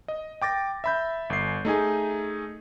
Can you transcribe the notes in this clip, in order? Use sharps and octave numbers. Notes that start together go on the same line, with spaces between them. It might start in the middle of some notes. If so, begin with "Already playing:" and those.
D#5
G5 D6 A6 A#6
E5 B5 G6
G1 C7
A3 D#4 G#4 G#5